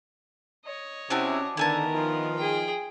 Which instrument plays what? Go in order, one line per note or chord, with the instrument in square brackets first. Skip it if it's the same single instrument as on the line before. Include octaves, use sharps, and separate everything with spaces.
[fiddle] C#5 D#5
[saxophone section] C3 E4 [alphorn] C#4 [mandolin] D4 F#4 G#5
[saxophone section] D3 [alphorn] D#3 [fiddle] B3 A#4 [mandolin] E4 G#5 A5
[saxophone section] F3 D#4 F4
[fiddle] G#4 G5